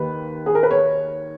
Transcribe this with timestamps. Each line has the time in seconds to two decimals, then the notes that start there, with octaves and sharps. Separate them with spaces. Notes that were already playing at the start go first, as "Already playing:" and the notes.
Already playing: D#2 D#3 B4
0.46 G#4
0.55 A#4
0.63 B4
0.71 C#5